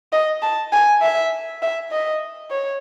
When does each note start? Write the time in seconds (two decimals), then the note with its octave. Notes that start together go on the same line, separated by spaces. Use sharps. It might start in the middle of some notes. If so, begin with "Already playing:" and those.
0.12 D#5
0.42 A5
0.72 G#5
1.02 E5
1.62 E5
1.91 D#5
2.50 C#5